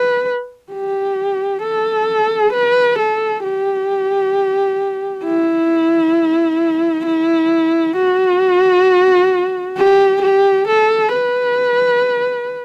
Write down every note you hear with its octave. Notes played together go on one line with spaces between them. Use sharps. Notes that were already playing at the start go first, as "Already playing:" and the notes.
Already playing: B4
G4
A4
B4
A4
G4
E4
E4
F#4
G4
G4
A4
B4